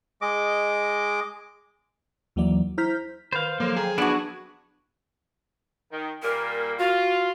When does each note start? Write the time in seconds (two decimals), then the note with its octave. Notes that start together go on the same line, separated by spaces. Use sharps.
0.22 G#3 D#5 D6
2.36 D#2 E3 F#3 A#3 D5
2.78 E4 C5 A#5 F6 G6 B6
3.32 D#3 B4 C5 F5 B5
3.60 F3 F#3 A#3 A4
3.76 G#4 G5 A#5
3.98 B3 D4 E4 F#4 D5 A5
5.91 D#3
6.23 A#2 G3 A#3 A#4
6.79 F4 F#4